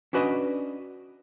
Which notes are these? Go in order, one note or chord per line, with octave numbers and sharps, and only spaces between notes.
C#4 D4 F#4 B4 D5 D#5